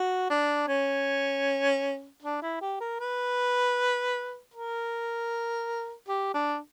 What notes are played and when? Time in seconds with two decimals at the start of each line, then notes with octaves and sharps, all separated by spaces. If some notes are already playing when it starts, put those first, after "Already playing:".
Already playing: F#4
0.30 D4
0.68 C#4
2.22 D4
2.42 E4
2.61 G4
2.80 A#4
3.00 B4
4.54 A#4
6.08 G4
6.34 D4